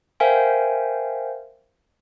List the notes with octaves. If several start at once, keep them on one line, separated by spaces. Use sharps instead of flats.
A#4 C5 E5 F5 G5 G#5